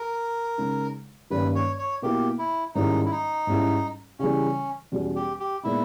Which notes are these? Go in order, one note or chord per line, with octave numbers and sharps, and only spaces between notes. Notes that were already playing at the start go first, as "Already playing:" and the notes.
Already playing: A#4
C#3 G#3 D#4
G2 D#3 A#3 C#4 B4
C#5
C#5
B2 A#3 E4 G4
E4
G#2 D#3 G3 C#4 D#4 E4
E4
D#4
G#2 G3 C#4 E4
C#3 E3 G3 C#4
E2 B2 G3 C#4
G4
G4
A#2 G#3 B3 D#4 E4